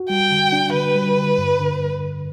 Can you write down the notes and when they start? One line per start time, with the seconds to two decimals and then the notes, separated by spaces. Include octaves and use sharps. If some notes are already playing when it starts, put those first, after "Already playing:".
Already playing: F#4
0.09 G3 G5
0.31 D3
0.52 D4
0.73 D3 B4
0.95 G3
1.17 D3
1.38 G2
1.60 D3